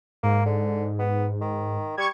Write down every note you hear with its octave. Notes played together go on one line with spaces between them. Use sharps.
G#2 A#3
D3
B3
D#3
G3 C#6 G#6